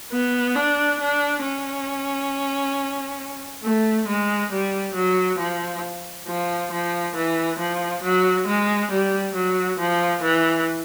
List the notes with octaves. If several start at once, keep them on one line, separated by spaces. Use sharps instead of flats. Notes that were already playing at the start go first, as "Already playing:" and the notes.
B3
D4
D4
C#4
A3
G#3
G3
F#3
F3
F3
F3
E3
F3
F#3
G#3
G3
F#3
F3
E3